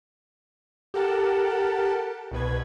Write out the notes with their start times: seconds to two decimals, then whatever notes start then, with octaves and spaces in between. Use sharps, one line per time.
0.94 G4 A4 A#4 F#5 A5
2.31 C2 B2 B4 G#6